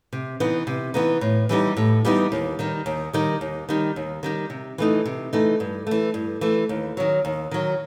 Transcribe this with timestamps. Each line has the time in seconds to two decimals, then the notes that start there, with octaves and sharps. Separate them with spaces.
0.13 C3
0.40 E3 B3 D#4
0.67 C3
0.94 E3 B3 D#4
1.21 A2
1.49 E3 G3 B3 D#4
1.77 A2
2.05 E3 G3 B3 D#4
2.32 D#2
2.59 D#3 G3 D#4
2.86 D#2
3.13 D#3 G3 D#4
3.41 D#2
3.69 D#3 G3 D#4
3.96 D#2
4.23 D#3 G3 D#4
4.50 C3
4.78 E3 A3 D#4
5.06 C3
5.33 E3 A3 D#4
5.60 G2
5.87 E3 A3
6.14 G2
6.41 E3 A3
6.69 D#2
6.97 D#3 F#3
7.25 D#2
7.51 D#3 F#3